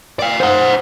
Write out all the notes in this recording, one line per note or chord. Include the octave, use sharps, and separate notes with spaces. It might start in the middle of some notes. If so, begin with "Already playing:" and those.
D5 F5
C5 F#5